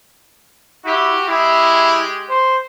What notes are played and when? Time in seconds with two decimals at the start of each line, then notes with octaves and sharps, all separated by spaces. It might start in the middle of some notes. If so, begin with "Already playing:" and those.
0.85 E4 F#4 G4
1.28 G#3 E4 G4 G#4
2.30 C5